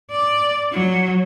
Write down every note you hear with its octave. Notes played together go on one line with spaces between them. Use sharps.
D5
F#3